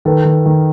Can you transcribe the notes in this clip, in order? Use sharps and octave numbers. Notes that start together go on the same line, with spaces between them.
D#3 A4 B4
D#3
D#3